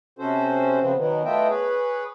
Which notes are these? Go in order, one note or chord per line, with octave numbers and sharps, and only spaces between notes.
C3 C#4 F#4 A4 C5
C#3 F3 B3 C4
B2 D#3 F#3 B3
A3 B3 F4 D#5 E5 G5
G#4 B4 C#5